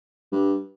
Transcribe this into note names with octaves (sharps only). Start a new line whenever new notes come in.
G2